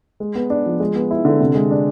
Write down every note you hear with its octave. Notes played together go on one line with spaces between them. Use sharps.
G#3
B3
D4
F3
G#3
B3
E4
D3
C3
G#3
D4